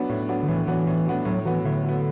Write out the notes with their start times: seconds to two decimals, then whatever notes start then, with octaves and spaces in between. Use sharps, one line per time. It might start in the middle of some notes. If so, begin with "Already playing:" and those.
Already playing: F#3 B3 D4
0.09 A2
0.29 F#3 B3 D4
0.43 D3
0.48 A2 E3
0.67 E3 F#3 B3 D4
0.87 A2
1.07 F#3 B3 D4
1.25 A2 F#3
1.45 E3 F#3 B3
1.65 A2 D3
1.84 F#3
1.89 B3